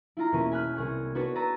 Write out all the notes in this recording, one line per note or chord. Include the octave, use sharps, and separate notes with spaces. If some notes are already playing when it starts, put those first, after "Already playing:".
E4 F4 A#5
E1 B2 A#3 C#4 D#7
G#5 B5 F6 F#6
C2 G#4 G#5 C#6
B3 D4 F#4 B4 C#5
B4 A#5 E6 A6 D#7